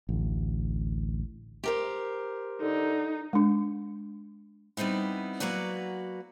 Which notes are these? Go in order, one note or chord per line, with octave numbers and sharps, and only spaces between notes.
A1 D2
G4 A#4 C5
D3 D#4
G#3 D4
G3 B3 C4 D#4 E4
F#3 A#3 F#4 B4 D5